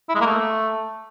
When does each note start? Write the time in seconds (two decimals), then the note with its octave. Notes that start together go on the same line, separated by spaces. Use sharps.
0.09 E4
0.15 G#3
0.21 A#3
0.26 A3